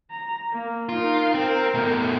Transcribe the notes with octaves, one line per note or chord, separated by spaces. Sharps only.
A#5
A#3
D#4 F4 A#4
C4 A#4
B2 A3